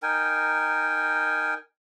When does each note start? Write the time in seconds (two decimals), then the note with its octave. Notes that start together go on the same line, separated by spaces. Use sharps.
0.03 D#4 A#4 G5 G#5